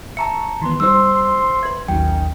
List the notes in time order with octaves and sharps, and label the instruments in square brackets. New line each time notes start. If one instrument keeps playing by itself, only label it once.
[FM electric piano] E5 C#6 [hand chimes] A5 A#5 C#7
[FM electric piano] D#3 E3 B3 [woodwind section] C6
[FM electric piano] G3 D#4 [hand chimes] C5 E6 [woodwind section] C6
[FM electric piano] B4 E5 [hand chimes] G#6
[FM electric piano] A1 D#2 F#3 [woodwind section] C#4 D#4 [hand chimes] G5